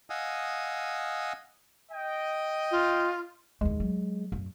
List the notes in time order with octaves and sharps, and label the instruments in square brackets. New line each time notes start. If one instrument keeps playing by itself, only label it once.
[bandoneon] D#5 F5 F#5 G#5 D#6 E6
[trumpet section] D#5 G5
[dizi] F4
[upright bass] D#2 D3 [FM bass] G#3
[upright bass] F#3
F#2